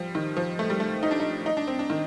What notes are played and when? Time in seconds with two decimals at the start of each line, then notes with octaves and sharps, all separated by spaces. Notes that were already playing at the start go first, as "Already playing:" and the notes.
Already playing: F3 G3
0.15 D#3
0.37 F3
0.59 A3
0.70 G3
0.80 A3
1.03 D#4
1.11 D4
1.20 D#4
1.46 D#4
1.57 D4
1.67 C4
1.79 D4
1.90 D#3